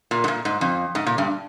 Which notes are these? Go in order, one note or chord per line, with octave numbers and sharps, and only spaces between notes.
A#2
G#2
A#2
G#2
F2
G#2
A#2
G2